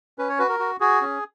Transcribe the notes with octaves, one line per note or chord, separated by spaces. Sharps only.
C#4 B4
C#5
F#4 B4
A#4
F#4
F#4 G#4
C#4